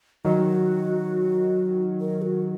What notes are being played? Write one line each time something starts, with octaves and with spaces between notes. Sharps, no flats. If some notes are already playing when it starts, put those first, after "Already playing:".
D#3 F#3 F#4
A#4
F#4